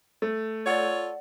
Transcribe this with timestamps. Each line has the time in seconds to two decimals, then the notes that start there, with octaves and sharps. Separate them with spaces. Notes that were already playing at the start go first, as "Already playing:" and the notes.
0.22 A3
0.67 F4 A4 C#5 D5 F#5